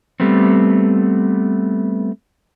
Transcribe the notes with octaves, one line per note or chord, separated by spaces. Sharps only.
G3 A3 B3 C4